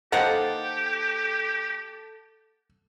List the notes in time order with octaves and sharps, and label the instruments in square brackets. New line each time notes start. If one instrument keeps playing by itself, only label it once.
[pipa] D#3 A#3 C5 [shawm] G4 [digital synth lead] A4 [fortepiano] F#5